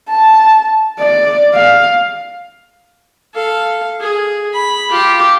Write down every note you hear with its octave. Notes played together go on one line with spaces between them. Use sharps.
A5
D5
F5
A4 F5
G#4
B5
F4 G4